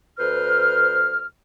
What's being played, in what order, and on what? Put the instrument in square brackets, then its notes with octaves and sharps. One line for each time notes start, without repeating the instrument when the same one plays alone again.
[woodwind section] D2 B4 C5 F6